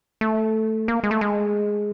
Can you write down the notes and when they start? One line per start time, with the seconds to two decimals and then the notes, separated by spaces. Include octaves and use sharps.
0.21 A3
0.88 A#3
1.03 G#3
1.11 A3
1.21 G#3